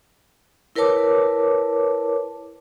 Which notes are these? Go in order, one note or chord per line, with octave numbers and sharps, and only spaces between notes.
E4 A#4 B4 C#5 A5 D6